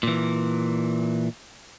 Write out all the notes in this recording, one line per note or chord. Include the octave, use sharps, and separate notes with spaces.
A#2 E3